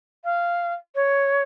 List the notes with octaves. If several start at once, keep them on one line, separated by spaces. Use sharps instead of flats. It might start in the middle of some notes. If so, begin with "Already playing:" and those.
F5
C#5